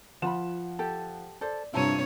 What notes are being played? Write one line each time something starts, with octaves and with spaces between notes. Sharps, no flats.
F3 F4 F#5 B5 E7
G4 A4
A4 C5 D5
G2 C3 E4 F4 C#5 A5 A#5 D#7